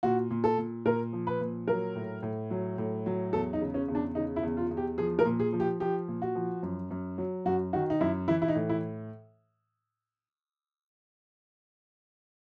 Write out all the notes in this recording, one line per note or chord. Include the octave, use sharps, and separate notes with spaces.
A#2 F#4
A#2
A4
A#2
A#2 A#4
F3
B4
A#2
F#3 A#4
A2
A2
F#3
A2
F#3
E2 A4
D#4
C#3
C#4
E2
D4
C#3 D#4
E4
E2
F4
E2
G4
F3 G#4
A#4
A#2
G#4
F3
G4
F3 G4
A#2
F#4
F3
F#2
F#2
F#3
F#2 F#4
D#3 F#4
D#4
F#2 E4
E3 E4
E4
D#4
A2
E4